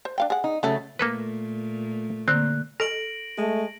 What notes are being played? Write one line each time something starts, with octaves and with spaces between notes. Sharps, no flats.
C5
D4 F5 G5
G#4 F#5
D#4
C#3 F#3 A3 C#4 A4
A#2 A3 A#3 A4 B4
D3 A#3 C4 F#6
A4 A#6 D7 F#7
G#3 A3